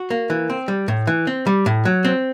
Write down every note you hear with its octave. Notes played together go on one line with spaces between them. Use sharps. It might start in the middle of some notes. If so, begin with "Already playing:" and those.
Already playing: F#4
A#3
E3
C4
G3
A2
E3
C4
G3
A2
F#3
C4